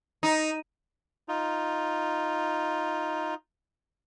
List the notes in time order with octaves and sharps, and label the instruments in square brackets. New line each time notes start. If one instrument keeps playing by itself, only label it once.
[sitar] D#4
[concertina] D#4 F4